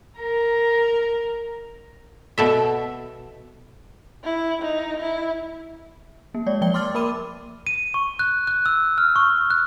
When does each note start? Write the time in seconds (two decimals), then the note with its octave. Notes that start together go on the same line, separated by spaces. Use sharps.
0.20 A#4 A#5
2.38 B2 A4 E5
4.24 E4
4.62 D#4
5.00 E4
6.34 A#3
6.46 G#3 C#5 D5
6.61 F3 A#3 D5 G5 G7
6.74 C6 D6 F6 A6
6.95 A#3 A#4 B5 D6 D#7
7.67 D#7
7.94 C#6
8.19 F#6
8.47 F#6
8.66 E6
8.98 F6
9.16 C#6
9.50 F#6